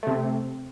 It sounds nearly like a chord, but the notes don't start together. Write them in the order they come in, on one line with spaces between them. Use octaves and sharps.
A3 C3 C4